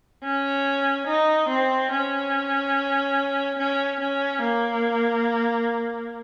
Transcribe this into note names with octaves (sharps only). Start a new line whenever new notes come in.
C#4
D#4
C4
C#4
C#4
C#4
A#3